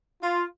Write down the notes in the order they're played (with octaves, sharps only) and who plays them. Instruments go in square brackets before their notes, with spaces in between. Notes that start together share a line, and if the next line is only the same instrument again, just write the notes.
[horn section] F4